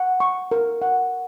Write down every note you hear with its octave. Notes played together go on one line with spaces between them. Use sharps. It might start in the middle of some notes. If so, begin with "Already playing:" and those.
Already playing: F#5
C#6
A#4
F#5